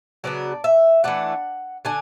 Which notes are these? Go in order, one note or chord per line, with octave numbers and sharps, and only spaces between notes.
C#3 F#3 B3 D4 D5
E5
E3 A3 D4 F#5
D3 D4 G#5